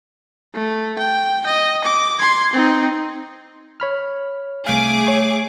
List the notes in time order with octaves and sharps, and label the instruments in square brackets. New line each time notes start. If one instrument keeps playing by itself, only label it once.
[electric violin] A3
G5
D#5
D6
C6 G#6
C4 D#4
[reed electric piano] C#5 B5 F6
[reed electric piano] C2 F5 [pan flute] A3 [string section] G#4 D6
[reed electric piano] C#5 G#5 C#6